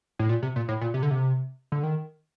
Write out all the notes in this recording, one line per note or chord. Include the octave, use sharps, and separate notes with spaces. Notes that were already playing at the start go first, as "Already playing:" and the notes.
A2
A#2
C3
A#2
A2
A#2
C3
D3
C3
D3
D#3